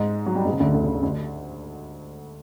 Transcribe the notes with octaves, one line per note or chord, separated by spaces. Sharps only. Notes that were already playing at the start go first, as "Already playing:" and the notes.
Already playing: G#2 G#3
F#3
G3
G#2 G#3
C#3
D2 D3
D2 D3
C#3
C#3
D2 D3